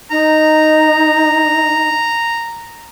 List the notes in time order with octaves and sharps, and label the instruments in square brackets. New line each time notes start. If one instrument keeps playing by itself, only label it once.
[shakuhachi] D#4 [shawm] A#5